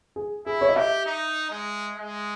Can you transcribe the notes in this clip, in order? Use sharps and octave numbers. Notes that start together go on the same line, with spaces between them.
G#4
E4 G#4
C#5
D#5
G4 E5
D#4
G#3
G#3